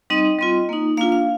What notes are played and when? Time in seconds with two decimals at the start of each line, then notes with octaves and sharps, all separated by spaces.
0.10 G3 C4 D#4 D#5
0.39 G3 C4 F4
0.69 A#3 D#4
0.97 A#3 D4 F4 F5
1.12 F5